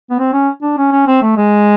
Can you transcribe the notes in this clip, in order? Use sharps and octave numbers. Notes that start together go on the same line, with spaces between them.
B3
C4
C#4
D4
C#4
C#4
C4
A3
G#3